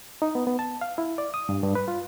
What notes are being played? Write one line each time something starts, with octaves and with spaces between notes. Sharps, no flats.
D#4
B3
B3
A5
F5
E4
D5
D#6
G2
G2
B4
F4